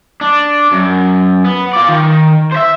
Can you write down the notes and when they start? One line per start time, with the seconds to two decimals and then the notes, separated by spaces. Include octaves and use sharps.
0.21 D4
0.72 F#2
1.45 B3
1.73 F4 D5
1.88 D#3
2.52 C5 E5